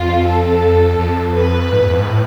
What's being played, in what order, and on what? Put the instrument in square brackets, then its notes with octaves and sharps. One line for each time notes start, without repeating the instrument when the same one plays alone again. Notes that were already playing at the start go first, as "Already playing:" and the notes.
Already playing: [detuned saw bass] F2 [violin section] F4
[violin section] A4
[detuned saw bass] F2
[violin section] B4
[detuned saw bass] G#2
E2
F2
G#2
A2